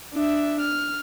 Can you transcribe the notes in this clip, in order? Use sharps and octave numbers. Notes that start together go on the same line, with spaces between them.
D4 E5
F6